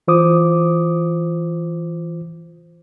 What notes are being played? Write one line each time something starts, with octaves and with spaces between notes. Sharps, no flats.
E3 F4 C5 D6 D#6